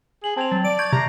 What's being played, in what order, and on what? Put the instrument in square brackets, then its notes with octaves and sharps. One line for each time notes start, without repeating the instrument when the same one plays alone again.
[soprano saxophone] G#4 [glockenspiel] F#7
[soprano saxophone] C4 [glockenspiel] A5 G#6 F7
[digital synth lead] F#3 [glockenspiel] A6
[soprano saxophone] D5 [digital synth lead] D7
[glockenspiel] C#6 G6 D7 [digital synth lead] G#6
[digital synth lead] C3 [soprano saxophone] A#5 [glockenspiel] A#6 C7